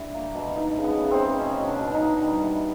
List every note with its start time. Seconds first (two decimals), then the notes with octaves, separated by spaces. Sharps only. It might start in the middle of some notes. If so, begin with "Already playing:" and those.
Already playing: D3 G3 E4
0.14 A#3
0.35 B2
0.56 A3 D#4
0.77 C#3
0.84 B3
0.97 C#3
1.11 C4
1.18 C#3
1.39 B2 C#4
1.60 B2
1.67 D4
1.80 B2
1.94 D#4
2.01 A#3
2.21 G3
2.43 E3